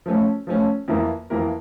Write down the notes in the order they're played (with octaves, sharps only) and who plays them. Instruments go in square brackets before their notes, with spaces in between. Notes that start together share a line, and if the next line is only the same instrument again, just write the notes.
[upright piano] F3 A3 C#4
F3 A3 C#4
F2 E3 A#3 E4 A#4
F2 E3 A#3 E4 A#4